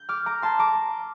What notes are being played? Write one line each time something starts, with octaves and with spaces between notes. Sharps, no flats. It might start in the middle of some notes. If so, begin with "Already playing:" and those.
Already playing: G6
D6 F6
A#5 D6
A5 C6
A#5 D6